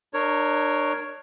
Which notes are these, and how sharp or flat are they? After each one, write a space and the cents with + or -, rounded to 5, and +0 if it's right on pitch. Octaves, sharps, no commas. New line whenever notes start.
D4 +30 A#4 +0 C#5 +0